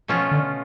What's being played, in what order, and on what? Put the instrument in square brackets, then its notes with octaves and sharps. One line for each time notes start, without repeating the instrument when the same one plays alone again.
[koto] B2 A3 C#4 F4 [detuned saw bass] F3
[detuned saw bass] D3